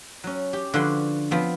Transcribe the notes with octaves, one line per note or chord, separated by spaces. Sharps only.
F#3 C#4
G4
D3 F3 F#4 B4 G#5 C6
F3 B3 C4